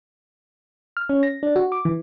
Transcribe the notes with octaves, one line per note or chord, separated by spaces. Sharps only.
F6
C#4
A#6
D4
F#4
D6
E3